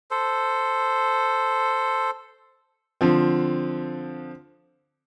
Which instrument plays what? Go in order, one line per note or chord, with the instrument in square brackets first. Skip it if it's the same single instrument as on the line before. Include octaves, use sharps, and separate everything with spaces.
[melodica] A4 C5
[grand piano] D3 F3 C4